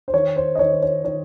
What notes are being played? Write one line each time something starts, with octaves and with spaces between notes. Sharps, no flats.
C5
D#3 C#5
C5
D#5
D#3 C#5
C5
C#5
D#3 C#5